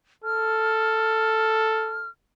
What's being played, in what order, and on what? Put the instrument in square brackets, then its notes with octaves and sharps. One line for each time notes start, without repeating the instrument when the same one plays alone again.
[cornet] A4 [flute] F6